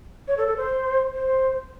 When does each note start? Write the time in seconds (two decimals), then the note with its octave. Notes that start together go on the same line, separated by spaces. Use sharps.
0.28 C#5
0.37 A4
0.47 A4
0.57 C5
1.13 C5